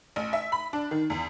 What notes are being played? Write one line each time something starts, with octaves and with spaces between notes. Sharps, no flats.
A1
E5
B5
D4
D#3
E2